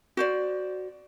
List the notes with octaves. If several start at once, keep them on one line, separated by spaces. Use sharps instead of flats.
F#4 C5 D5